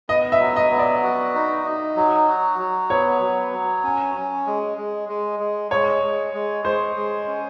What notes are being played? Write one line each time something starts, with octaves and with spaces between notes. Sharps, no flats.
B3 D#5
E5
F#3
D#5
B3
D5
F#4
D#4
D#4
F#3
F#4
F#3
B3 C#5
F#3
F#3
C#4
C#4
G#3
G#3
G#3
G#3
G#3 C#5
G#3
G#3
G#3 C5
G#3
C#4